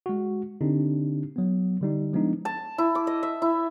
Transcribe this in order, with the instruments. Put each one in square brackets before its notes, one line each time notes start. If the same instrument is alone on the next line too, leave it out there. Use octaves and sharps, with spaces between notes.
[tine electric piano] G#3 F#4
D3 C4 D4 D#4 G4
F#3 B3
D3 G3 D#4
F3 G#3 B3 D4 D#4
[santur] A5
E4
D6
D#5
E5
E4